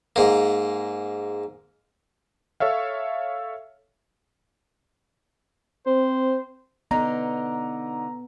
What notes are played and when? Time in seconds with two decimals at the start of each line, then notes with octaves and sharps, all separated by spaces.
0.16 G#2 A#3
2.60 A4 C#5 E5 F5
5.87 C4 C5
6.91 D3 B3 D#4 A#5